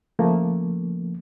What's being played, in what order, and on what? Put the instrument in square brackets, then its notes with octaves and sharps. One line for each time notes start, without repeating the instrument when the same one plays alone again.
[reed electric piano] C#3 F3 A3 A#3